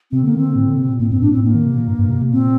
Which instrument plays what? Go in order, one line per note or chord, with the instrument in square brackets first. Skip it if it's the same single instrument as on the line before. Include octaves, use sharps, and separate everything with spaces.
[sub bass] C3 [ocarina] C4
[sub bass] D3 [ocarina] A#3
[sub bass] D#3 [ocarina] C4
[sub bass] D3
A2
D3
C3
A#2
[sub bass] A2 [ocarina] A#3
[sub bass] G2 [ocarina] C4
[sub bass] A2 [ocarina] D4
[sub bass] A2 [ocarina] C4
[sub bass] A2 [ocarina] A#3
[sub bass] D#3
C3
A#2
G2
G2
C3
C3
[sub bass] A#2 [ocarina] C4